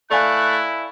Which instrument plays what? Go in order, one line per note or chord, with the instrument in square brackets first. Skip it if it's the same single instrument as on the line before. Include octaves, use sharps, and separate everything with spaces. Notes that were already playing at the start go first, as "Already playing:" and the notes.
[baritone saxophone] A3 [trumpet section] E4 [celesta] D5 F5 G#5 [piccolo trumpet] F#6